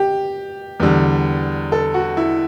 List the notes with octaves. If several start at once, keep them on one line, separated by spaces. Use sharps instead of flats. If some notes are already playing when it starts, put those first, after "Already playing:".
Already playing: G4
E2 D3 G3
A4
F#4
E4